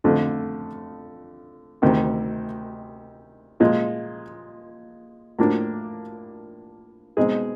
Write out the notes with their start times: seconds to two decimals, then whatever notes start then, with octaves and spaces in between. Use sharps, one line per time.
0.04 F2 D3 F3 A3
1.82 D2 C3 D#3
3.60 A#2 F3 G#3
5.39 A2 F3 A#3 D4
7.17 B2 G#3 C4 D#4 G#4